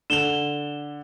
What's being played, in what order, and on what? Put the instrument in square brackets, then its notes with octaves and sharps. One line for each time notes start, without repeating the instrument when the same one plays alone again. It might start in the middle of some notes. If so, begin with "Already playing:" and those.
[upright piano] D3 F7 [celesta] E7 G7